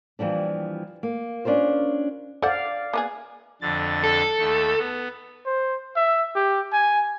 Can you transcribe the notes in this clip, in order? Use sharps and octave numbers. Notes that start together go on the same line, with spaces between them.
D#2 E3 F3 G3 D4
A#3
C#4 D4 F4 A#4 C5
A4 C5 D5 F5 F#5
A#3 B3 G#4
F2 D3 A6
A4
D#2 A3
B3
C5
E5
G4
G#5